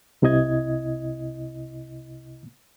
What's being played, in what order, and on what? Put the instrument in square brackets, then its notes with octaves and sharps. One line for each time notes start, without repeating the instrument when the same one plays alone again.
[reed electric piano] C2 C3 E4 D#5 G#6